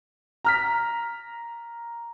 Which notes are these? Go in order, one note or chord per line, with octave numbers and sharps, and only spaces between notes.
A#5 F6 B6